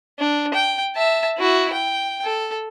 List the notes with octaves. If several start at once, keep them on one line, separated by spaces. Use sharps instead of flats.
D4
G5
E5 A5
E4 F#4
G5
A4